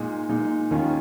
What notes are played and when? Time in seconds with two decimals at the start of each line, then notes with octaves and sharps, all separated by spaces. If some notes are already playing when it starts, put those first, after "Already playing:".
Already playing: A#2 G#3 D#4
0.29 A#2 G#3 D#4
0.71 D#2 D#3 A#3 C#4 F4